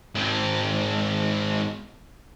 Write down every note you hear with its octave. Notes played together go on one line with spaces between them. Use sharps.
G#2 C4